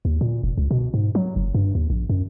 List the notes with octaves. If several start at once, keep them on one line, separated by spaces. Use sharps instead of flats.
D#2
A#2
F1
C#2
B2
G#2
F#3
F#1
G2
D#2
A#1
F#2